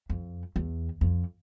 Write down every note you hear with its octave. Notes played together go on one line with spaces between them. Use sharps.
F2
E2
F2